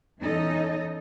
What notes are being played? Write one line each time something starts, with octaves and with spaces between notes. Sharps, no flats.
E2 E3 C#4 D#4 A4 D#5